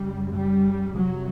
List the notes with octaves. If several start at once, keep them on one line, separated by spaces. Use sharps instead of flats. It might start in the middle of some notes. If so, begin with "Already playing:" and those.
Already playing: F#2 C#3 G3
G3
F2 C3 F#3